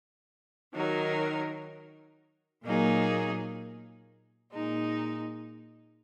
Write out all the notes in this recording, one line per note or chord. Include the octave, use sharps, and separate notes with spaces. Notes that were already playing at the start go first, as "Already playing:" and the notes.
D#3 F#3 D#4 A#4
A#2 F#3 A#3 D#4 G#4
A#2 G#3 D#4